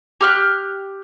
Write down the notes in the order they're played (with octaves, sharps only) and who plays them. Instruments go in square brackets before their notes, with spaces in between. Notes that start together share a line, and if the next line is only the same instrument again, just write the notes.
[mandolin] G4 F6 F#6